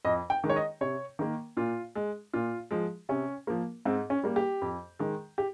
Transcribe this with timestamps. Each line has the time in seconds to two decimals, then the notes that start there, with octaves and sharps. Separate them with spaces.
0.05 F2 D#5
0.30 G5
0.44 D#3 G#3
0.50 C#5
0.56 D#5
0.81 C3 C#5
1.19 D#3 A#3
1.57 A#2 F4
1.96 G#3
2.33 A#2 F4
2.71 F3 G#3
3.09 C3 C#4
3.47 F3 A#3
3.85 G#2 C4
4.10 C#4
4.23 G3 A#3
4.36 G4
4.62 F2
4.99 D#3 G#3
5.38 G4